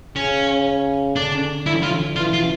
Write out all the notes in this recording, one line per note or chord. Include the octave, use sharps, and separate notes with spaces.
C#3 C#4
D3 D4
D3 E4
F4
E3 F4
F4